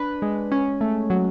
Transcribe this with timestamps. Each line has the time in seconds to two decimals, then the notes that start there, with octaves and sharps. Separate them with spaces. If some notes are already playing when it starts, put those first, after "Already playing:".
Already playing: D4 B4
0.22 G#3
0.52 C#4
0.81 A3
1.10 F#3